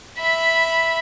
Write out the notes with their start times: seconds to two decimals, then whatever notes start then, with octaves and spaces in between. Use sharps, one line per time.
0.18 E5 B5